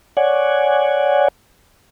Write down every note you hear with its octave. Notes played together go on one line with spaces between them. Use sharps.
C#5 D5 F#5 G#5